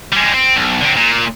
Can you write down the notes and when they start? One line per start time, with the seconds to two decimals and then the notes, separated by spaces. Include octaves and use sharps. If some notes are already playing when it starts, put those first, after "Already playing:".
0.12 G3 G#3
0.34 C4
0.56 B1
0.81 D3 C4
0.97 A#2